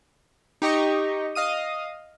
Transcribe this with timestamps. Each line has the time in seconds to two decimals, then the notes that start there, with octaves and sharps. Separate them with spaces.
0.62 D#4 G4 D#5 C#6
1.35 D#5 F5 D#6 D#7